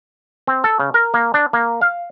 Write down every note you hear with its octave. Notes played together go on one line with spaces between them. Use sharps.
C4
A4
C#3
A#4
A#3
D4
A#3
F5